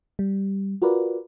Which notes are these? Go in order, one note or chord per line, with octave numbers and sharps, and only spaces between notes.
G3
F4 F#4 A#4 B4 D5